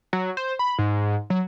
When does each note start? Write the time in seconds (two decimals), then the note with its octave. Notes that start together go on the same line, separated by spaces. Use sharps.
0.13 F#3
0.37 C5
0.59 B5
0.79 G#2
1.30 F#3